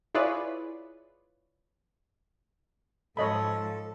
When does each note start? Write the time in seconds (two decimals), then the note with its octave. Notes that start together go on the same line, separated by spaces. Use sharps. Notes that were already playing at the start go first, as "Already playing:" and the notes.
0.14 E4 F4 G#4 B4 C#5 D5
3.17 G#2 F3 A4 C#5 D#5 B5